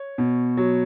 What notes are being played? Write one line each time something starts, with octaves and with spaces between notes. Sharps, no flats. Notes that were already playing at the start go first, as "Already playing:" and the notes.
Already playing: C#5
B2
F#3